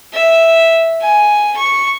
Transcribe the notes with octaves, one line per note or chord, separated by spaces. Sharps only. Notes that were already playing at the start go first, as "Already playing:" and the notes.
E5
G#5
C#6